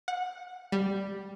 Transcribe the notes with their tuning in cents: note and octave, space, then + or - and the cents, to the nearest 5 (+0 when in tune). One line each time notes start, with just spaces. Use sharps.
F#5 -20
G3 +0